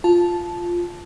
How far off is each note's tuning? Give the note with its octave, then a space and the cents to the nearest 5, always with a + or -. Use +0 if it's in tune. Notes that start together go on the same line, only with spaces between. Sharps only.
F4 +0 A5 -10